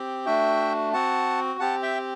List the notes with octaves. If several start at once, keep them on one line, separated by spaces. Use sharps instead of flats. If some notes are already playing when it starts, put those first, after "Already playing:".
Already playing: C4 G4
A3 D4 F#4 E5 G5
C4 F#4 F#5 A5
C4 G4 F#5 A5
E5 G5